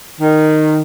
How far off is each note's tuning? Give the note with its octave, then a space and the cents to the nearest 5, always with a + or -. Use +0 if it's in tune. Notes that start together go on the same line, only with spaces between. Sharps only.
D#3 -10